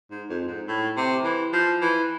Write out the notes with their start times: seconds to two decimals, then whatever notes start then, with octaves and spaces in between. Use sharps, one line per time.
0.11 G#2
0.30 F2
0.48 G#2
0.67 A2
0.96 C3
1.24 E3
1.53 F3
1.81 E3